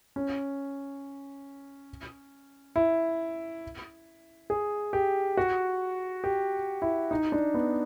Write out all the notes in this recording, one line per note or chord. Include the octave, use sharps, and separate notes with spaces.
C#4
E4
G#4
G4
F#4
G4
E4
D#4
D4
B3